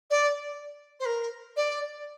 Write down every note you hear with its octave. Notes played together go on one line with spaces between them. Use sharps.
D5
C5
A#4
D5